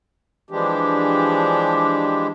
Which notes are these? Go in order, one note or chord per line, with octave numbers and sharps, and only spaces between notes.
E3 F3 G#3 D4 G4